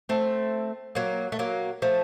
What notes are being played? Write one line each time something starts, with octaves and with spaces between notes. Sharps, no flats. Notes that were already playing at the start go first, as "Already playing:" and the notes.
A3 C4
F#3 A#3
A3
F#3 A#3
F3 A3